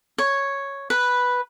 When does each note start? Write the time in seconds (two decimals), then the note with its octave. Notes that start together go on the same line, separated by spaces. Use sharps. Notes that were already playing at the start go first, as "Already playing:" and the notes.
0.18 C#5
0.90 B4